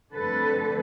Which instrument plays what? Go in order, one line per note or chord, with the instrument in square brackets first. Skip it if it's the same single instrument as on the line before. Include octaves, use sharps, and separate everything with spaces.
[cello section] D3 F3 A3 C4 A4 B4